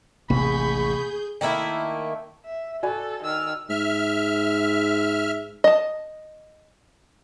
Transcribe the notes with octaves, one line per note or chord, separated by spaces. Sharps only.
A1 D#2 C3 A#3 G#4 B5 C#6 G6
D#3 A3 A#3 E4
E5
F#4 A4 D5 G#5
D#3 E6 F6
G#2 E5 F6
D#5 A5